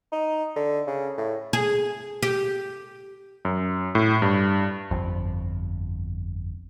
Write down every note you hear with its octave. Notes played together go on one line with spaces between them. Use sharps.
D#4
D3
C#3
A2
G#4
G4
F#2
A2
G2
G1 F2